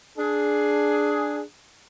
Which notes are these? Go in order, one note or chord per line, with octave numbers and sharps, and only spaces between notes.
D4 G#4